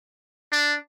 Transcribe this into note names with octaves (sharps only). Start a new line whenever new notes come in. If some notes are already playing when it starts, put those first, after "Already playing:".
D4